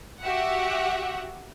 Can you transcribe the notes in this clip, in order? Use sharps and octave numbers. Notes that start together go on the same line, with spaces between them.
F#4 G4 E5 F#5